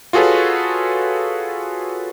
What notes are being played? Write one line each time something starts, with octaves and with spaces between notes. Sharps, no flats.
F4 F#4 G#4 A4 B4 C#5